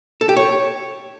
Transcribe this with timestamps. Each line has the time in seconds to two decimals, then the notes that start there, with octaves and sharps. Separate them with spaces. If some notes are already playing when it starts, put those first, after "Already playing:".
0.21 A4
0.29 G4
0.37 C#5